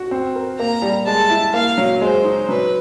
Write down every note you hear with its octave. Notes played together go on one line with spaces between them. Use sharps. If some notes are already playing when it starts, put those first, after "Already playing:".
Already playing: F#4
C4
A#4
A#3 A#5
G3
G#3 A5
E4
A#3 F5
F#3
G#3 C5
D#4
F#3 B4